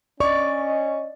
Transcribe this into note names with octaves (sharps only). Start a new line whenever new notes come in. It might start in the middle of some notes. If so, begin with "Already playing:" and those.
C#4 D5 D#5 C#6